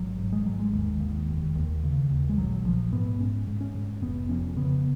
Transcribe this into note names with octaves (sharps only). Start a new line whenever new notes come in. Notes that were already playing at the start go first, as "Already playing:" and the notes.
Already playing: G#1 F#3
G#2
G#3
G#1 F#3
G#3
D#2
D#2
F1
D#2
C#3
D#2
G#3
A#1 F#3
A#1 F3
G#2 B3
G#2 C#4
G#2
C#4
G#2
F1 B3
F2 C#4
C#3 B3